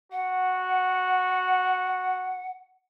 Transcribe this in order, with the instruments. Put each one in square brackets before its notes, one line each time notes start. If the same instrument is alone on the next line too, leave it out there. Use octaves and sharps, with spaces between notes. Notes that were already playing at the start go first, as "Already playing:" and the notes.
[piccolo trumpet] F#4 [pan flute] F#5